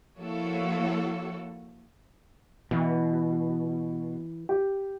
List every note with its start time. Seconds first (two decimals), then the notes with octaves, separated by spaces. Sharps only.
0.18 F3 A#3 E4 F#4 A4 C#5
2.71 B2 E3
4.49 G4